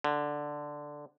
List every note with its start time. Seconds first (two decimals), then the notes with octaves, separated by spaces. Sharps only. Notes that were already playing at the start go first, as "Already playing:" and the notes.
0.04 D3